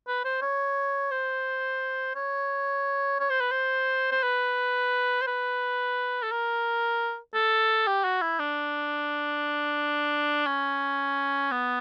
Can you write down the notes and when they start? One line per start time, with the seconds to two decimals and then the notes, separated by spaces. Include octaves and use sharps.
0.08 B4
0.24 C5
0.42 C#5
1.11 C5
2.15 C#5
3.20 C#5
3.30 C5
3.41 B4
3.52 C5
4.12 C5
4.23 B4
5.22 C5
5.27 B4
6.23 A4
6.31 A#4
7.34 A4
7.87 G4
8.04 F#4
8.22 E4
8.39 D4
10.47 C#4
11.52 B3